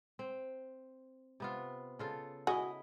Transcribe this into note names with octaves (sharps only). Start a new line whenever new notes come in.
C4
C3 B3 F4
C#3 F4 A4
E4 F#4 G#4 D#5